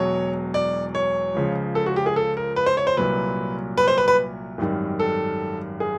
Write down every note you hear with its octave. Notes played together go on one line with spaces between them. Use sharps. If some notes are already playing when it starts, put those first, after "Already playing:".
Already playing: E1 E2 B2 F#3 C#5
D5
C#5
C#2 C#3 F3
A4
F#4
G4
G#4
A4
A#4
B4
C5
C#5
C5
C2 A#2 F#3 B4
B4
C5
B4
B4
G#1 F#2 D#3 G3
A4
G#4